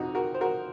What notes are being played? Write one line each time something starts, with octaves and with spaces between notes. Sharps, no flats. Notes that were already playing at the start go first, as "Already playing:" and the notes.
Already playing: F2 C3 F3 D#4 F#4
F#4 A#4
C5
F#4 A#4